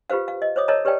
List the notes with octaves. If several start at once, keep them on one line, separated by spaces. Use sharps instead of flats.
F4 G4 B4 C5 F5
F5
D#5
C5 C#5 D6 D#6
A#4 C#5 D#5 E5 A5 A#5
G4 B4 C#5 D5 G5 A5